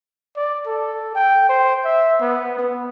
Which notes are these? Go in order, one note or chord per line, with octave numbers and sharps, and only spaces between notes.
D5
A4
G5
C5
E5
B3
B3